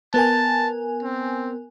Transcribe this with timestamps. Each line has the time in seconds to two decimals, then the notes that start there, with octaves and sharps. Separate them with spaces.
0.14 B3 A#4 G#5 A5
1.03 C4